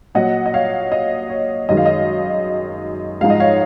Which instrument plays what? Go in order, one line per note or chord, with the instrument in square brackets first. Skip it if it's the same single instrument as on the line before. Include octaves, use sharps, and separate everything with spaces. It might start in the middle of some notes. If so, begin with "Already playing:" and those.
[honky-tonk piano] A#2 F#3 D#5 F#5
D#5
C#5 F5
D#5
C#5
F#2 D#3 G#3 D#5
F5
D#5
G#2 F3 G#3 F5
D#5
C#5 F5